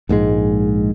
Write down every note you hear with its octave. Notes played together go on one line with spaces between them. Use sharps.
A#1 G#2 C#3 G#3